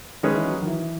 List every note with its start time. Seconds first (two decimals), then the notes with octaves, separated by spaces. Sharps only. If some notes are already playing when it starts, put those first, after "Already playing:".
0.23 D#3 G#3 C#4 G#4 B4
0.35 E3
0.46 F#3
0.56 F#3
0.62 D#3
0.67 E3